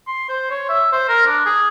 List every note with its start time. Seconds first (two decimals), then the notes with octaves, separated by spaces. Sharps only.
0.07 C6
0.29 C5
0.51 C#5
0.69 E5
0.92 C5
1.09 A#4
1.27 D4
1.46 G#4